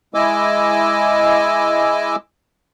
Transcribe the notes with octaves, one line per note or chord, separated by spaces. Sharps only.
G#3 E4 D#5 G#5 D6 E6